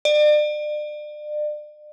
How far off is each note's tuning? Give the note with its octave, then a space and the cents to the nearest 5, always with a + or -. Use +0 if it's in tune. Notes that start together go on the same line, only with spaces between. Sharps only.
D5 +35